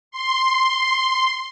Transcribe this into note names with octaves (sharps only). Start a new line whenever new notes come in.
C6